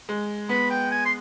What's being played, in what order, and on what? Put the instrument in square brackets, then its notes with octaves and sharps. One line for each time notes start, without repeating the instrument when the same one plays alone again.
[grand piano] G#3
[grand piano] B3 [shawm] B5
[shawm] G5
G#5
C6